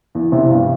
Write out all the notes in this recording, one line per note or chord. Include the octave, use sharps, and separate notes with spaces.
E2
C3 E3
G2